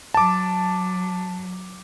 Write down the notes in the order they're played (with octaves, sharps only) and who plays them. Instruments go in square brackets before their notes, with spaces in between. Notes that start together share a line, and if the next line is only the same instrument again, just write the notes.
[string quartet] F#3 [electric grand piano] A5 D6